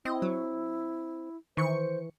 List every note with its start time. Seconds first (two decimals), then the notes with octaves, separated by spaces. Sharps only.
0.05 C4 E4 D#5
0.22 F#3
1.57 D#3 E3 C5 C#6 C#7